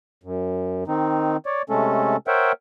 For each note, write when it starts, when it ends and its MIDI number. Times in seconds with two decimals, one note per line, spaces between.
0.24 0.84 42
0.88 1.37 51
0.88 1.37 60
0.88 1.37 63
1.46 1.62 73
1.46 1.62 74
1.70 2.16 48
1.70 2.16 56
1.70 2.16 57
1.70 2.16 61
1.70 2.16 69
2.27 2.52 70
2.27 2.52 72
2.27 2.52 73
2.27 2.52 76
2.27 2.52 78
2.27 2.52 79